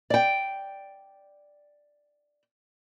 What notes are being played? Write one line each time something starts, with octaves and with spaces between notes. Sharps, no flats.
D5 G5